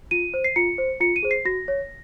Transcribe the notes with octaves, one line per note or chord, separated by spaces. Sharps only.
F4 D#7
C5
C7
F4 C#7
C5
F4 C#7
D#7
G#4 C5
C7
F#4 A#6
C#5